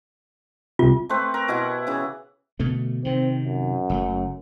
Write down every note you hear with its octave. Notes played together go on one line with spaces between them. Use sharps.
C2 C3 F4
A3 C4 B4 C5
A#4
B2 E4 G4 F#5
C#3 E3
B2 D3 A3
C3 D#3 C4
F#2
F#1 C3 A3